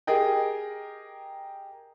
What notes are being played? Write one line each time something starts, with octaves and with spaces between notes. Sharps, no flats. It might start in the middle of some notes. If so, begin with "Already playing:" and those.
G4 G#4 A#4 D#5 G5